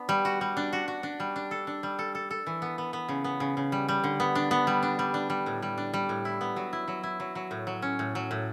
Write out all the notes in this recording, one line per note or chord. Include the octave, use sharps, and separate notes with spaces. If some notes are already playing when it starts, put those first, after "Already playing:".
Already playing: B3 D4
G3
F#4
G3
D4
F#4
F#4
D4
G3
D4
A4
D4
G3
A4
A4
A4
E3
B3
B3
B3
C#3
B3
C#3
C#3
G3
G3
D3
B3
D4
B3
G3
D4
G3
D4
G3
A2
G3
D4
G3
A2
E4
B3
F#3
E4
F#3
E4
F#3
F#3
A2
F#3
C#4
A2
F#3
A2